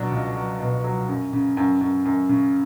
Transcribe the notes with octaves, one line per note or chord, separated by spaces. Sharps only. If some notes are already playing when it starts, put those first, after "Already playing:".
Already playing: B2 F#3 D4
C#2
F#3
B2
F#3
F#2
C#3
F#2
F#2
F#2
C#3